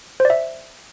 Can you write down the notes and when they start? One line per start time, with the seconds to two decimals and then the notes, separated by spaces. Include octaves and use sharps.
0.20 C5
0.25 D5
0.30 E5